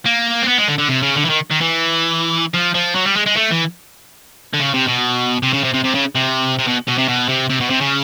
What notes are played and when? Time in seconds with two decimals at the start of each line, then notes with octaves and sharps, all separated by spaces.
0.06 A#3
0.42 C4
0.48 B3
0.58 G#3
0.68 D3
0.78 D3
0.89 C3
1.02 C#3
1.16 D3
1.25 E3
1.30 D#3
1.51 D#3
1.61 E3
2.54 F3
2.74 F3
2.95 F#3
3.06 G3
3.16 G#3
3.26 G#3
3.36 A3
3.50 E3
4.54 D3
4.60 C#3
4.74 C3
4.88 B2
5.43 C3
5.53 C#3
5.64 C3
5.74 C3
5.84 C3
5.95 C#3
6.15 C3
6.59 C3
6.67 B2
6.88 B2
6.98 C3
7.08 B2
7.29 C3
7.50 C3
7.60 B2
7.70 C3
7.81 C#3